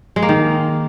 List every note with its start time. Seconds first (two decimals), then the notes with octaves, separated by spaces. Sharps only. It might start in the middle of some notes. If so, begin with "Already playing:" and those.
0.16 G#3
0.22 A#3
0.29 D#3